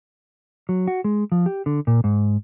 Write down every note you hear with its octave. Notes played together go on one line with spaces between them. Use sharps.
F#3
F#4
G#3
F3
G4
D3
A#2
G#2